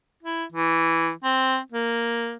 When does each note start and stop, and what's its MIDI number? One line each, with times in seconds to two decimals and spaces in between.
0.23 0.44 64
0.52 1.11 52
1.24 1.59 60
1.72 2.36 58